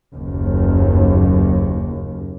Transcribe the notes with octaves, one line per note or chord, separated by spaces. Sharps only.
F#1 D#2